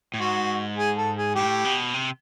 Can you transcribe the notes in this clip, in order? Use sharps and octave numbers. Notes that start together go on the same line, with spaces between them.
A2
G#2 F#4
G#4
A4
G#4
A2 G4
B2
C3